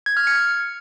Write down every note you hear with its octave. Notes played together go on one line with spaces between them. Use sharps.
G#6
F6
C#7